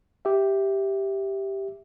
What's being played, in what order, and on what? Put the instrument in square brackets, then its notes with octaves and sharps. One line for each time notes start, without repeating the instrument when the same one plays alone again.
[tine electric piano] G4 E5